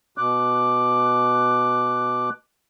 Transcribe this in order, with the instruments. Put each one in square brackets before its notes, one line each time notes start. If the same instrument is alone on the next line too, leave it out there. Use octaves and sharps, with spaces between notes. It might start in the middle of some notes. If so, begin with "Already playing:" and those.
[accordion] B2 D6 F#6